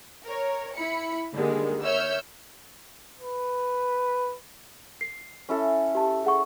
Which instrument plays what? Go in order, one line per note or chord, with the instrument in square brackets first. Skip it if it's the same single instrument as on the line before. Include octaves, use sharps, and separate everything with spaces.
[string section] A#4 C#5
E4 B5 C#7
D3 D#3 G3 G#3 A#3
C#5 E5 E6 F6 G6
[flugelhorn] B4
[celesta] C7
[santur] C#4 E4 A4
[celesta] G4 A5
G#4 F#5 C#6